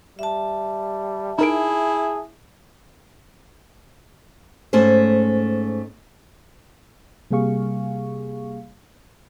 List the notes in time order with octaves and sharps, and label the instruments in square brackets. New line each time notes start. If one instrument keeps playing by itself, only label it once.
[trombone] G3 [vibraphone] E5 A5
[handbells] D#4 A#4 D7 [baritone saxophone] E4 [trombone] G#4
[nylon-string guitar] G#2 A3 C#4 C5
[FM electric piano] C3 G3 A#3 G#4 F5 C#6